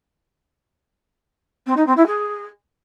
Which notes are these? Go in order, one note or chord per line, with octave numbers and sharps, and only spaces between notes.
C4
D#4
C4
E4
G#4